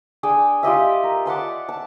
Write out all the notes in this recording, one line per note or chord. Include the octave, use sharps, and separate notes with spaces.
D4 G#4 G5 G#5
F4 G4 D#5 E5
A#4
D5 F#5 A5 C6
A5